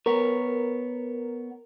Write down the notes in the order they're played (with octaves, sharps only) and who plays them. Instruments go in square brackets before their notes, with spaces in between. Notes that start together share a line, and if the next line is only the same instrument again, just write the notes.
[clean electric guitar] B3 C#5 [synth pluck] A#4